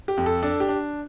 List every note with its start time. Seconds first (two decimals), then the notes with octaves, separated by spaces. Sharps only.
0.08 G4
0.17 F2
0.26 A4
0.43 D4 A4
0.60 G4
0.69 D4